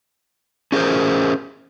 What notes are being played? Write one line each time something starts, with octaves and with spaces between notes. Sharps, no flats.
C#4 G#4 A#4 C5